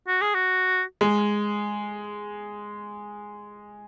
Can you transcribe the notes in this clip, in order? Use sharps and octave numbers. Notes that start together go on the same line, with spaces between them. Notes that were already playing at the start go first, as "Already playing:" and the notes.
F#4
G#4
F#4
G#3